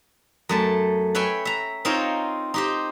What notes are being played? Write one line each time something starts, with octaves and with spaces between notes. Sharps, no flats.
F#2 A3 A5
B4 C#5 E5 G5 G#5
E5 A#5
C4 D#4 F4 A#4 C5 C#5
D#4 G4 C5